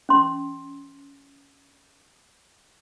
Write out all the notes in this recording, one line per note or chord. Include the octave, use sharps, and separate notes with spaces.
C#4 C6